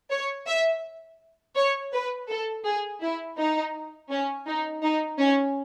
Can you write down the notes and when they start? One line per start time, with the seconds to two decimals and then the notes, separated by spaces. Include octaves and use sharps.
0.11 C#5
0.47 E5
1.56 C#5
1.93 B4
2.29 A4
2.65 G#4
3.02 E4
3.38 D#4
4.10 C#4
4.47 D#4
4.84 D#4
5.19 C#4